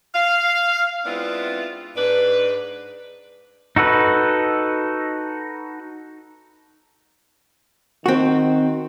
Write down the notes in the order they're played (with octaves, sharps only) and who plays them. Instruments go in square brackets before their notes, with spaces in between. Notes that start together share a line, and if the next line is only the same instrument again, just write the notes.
[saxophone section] F5
G#3 B3 C4 D4 E4 F4
G#2 D4 B4
[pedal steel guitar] D#4 F#4 A4 B4
[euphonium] D#3 [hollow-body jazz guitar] C4 F#4